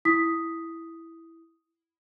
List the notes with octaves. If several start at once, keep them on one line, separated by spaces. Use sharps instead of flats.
E4 D#6 B6